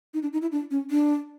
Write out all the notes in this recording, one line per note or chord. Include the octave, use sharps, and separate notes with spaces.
D#4
D4
D#4
E4
D4
C#4
D4